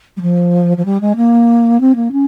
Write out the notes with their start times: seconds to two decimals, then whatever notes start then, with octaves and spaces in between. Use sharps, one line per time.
0.17 G3
0.22 F3
0.77 F3
0.85 G3
1.01 G#3
1.16 A#3
1.80 C4
1.95 A#3
2.12 C#4